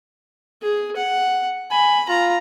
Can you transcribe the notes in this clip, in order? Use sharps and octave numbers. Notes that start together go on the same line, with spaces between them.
G#4
F#5
G#5 B5
F4 A#5